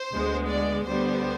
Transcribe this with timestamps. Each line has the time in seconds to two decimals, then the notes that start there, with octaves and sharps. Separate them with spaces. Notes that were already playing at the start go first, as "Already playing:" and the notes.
Already playing: C5
0.12 D2 D3 G#3 B3
0.48 D5
0.85 D2 D3 G3 B3 C5